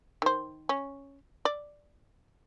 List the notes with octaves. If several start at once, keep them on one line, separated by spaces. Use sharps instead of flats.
D#3 C5
C#4
D5